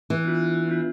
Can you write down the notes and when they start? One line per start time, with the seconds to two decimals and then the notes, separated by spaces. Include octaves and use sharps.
0.10 E3
0.24 B3 D4 F4
0.67 B3 D4 F4